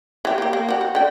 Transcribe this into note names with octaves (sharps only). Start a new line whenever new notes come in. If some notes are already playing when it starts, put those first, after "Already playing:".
E3 G4
A#3 G4
A#3
F#4 G4
F#4
D3 G5